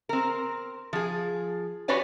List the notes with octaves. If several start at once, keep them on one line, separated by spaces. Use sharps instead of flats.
C4 A#4
F3 G#4
F#4 G4 B4 C#5 D5 G#5